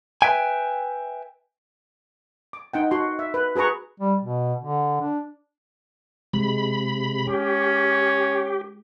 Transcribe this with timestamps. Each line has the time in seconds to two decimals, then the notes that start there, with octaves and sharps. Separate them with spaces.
0.22 B4 E5 G5 G#5
2.53 D6
2.74 D#4 F#5 G5
2.91 F#4 C6
3.19 E5
3.34 B4
3.56 F#4 G#4 B4 A#5 C#6
4.00 G3
4.22 B2
4.59 D3
5.01 D4
6.34 C3 G#3 B5
7.27 C#4 G4